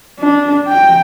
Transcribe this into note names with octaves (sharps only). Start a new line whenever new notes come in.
D4
G5